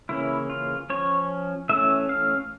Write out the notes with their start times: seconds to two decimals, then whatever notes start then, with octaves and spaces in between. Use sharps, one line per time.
0.09 C#3 E3 A#3 C#4 E4
0.50 F4
0.90 F3 C#4 C#5
1.69 E3 A3 C#4 E5
2.09 F5